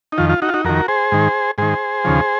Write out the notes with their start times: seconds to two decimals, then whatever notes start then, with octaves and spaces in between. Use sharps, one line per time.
0.12 D#4
0.18 F2 D#3 F4
0.30 F4
0.42 D#4 F#4
0.49 F4
0.54 D#4 F#4
0.65 F2 D#3 F#4 A#4
0.88 G#4 C5
1.12 G#2 D#3
1.58 G#2 D#3 G#4 C5
2.04 D#2 C#3 F3